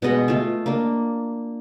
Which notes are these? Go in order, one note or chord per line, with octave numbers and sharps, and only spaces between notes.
B2 G#3 D#5 F#5
A3 F4
A#3 D4